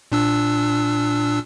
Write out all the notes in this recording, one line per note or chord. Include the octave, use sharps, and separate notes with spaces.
A#2 D4 E6